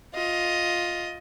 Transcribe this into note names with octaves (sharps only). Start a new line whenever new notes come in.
F4 D#5